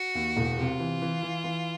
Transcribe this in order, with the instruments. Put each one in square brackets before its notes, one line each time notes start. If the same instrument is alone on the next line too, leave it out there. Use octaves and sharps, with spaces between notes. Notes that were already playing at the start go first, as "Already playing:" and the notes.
Already playing: [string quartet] F#4
[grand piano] D#2
E1
[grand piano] C3 [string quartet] F4
[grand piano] E3
E3
E3
E3